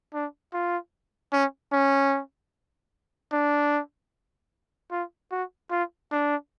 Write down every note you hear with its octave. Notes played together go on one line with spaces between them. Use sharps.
D4
F4
C#4
C#4
D4
F4
F#4
F4
D4